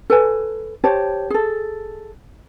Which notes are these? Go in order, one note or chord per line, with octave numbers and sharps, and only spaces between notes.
A4 B4 G#5
G4 C5 C#5 A5
G#4 A4